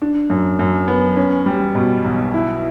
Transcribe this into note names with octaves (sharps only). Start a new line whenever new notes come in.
D4
F#2
F#2
B3
C#4
G3
B2
B1
E4